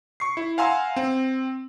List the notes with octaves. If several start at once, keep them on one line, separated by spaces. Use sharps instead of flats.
C#6 C7
E4
F5 F#5 G#5 A#5 C6 E6
C4